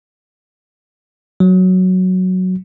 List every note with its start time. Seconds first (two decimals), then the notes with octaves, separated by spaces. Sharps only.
1.40 F#3